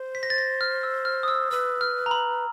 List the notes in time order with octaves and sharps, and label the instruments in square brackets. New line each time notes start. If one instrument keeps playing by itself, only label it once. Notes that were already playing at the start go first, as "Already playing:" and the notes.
Already playing: [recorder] C5
[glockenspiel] B6
A#6
A6
A#6
F6
E6
F6
D#6
E6
[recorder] B4 [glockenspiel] E6
[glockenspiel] F6
A#5
B5